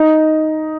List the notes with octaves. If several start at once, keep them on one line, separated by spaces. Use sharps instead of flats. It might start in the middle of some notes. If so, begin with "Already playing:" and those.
Already playing: D#4